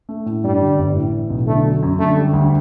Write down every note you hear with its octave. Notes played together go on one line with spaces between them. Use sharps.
A3
A2
G2 G3
D3
G1
A2
E3
B1
D3 A3
F#3
F#2
D3 A3
G3
D2